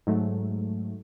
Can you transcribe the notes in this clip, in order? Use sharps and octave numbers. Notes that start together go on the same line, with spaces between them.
G#2 F#3 A3